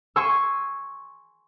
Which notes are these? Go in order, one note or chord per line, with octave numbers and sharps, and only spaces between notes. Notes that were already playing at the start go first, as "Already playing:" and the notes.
G#5 C6 C#6 E6